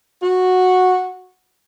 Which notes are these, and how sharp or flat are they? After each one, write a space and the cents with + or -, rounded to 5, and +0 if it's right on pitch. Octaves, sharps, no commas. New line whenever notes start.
F#4 -10